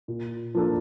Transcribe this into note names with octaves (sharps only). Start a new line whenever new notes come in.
A#2
F3 A#3 D4 A4